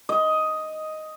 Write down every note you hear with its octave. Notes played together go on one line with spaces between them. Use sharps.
D#5